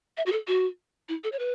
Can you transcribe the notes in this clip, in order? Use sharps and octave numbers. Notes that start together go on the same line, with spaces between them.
E5
F#4
A4
F#4
E4
A4
C#5
B4